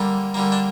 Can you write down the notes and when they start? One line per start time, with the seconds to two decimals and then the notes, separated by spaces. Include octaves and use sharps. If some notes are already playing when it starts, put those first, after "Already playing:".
Already playing: D3 G3 A#3
0.34 D3 G3 A#3
0.52 D4